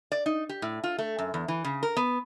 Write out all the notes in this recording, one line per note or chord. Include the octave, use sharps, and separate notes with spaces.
D5
D#4
G4
A2
F4
A3
F#2
E2
E3
C#3
A#4
B3